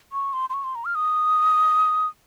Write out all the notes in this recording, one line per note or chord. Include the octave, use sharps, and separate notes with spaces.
C#6
C6
C6
C#6
C6
A#5
F6
D#6